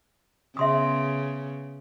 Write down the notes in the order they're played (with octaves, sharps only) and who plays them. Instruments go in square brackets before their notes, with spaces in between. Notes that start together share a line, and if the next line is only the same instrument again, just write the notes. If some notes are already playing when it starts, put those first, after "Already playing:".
[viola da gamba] C#3 B3 [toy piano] E5 C6 D#6